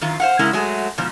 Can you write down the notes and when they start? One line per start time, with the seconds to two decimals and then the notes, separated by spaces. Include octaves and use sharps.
0.01 F#2 D#3 F4
0.20 C5 F5 F#5
0.39 C#3 G#3 C#4 E4 A#4
0.53 F#3 G#3 A3 G#4
0.98 G#2 B2 F3